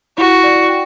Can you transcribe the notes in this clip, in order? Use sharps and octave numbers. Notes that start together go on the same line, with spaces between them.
E4 F#4
D5
G5